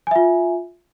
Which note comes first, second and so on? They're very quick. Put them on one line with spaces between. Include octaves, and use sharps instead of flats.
G#5 E5 F4